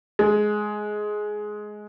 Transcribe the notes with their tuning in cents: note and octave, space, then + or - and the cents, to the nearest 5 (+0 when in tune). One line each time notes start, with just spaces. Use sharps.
G#3 +15